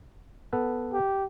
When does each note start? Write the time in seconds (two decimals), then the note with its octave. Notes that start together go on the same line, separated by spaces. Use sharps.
0.53 B3 A4 B4
0.93 G4